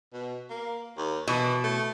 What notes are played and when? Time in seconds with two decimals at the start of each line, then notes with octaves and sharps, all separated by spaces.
0.13 B2
0.50 A#3
0.97 D#2
1.28 B2 E3
1.63 A3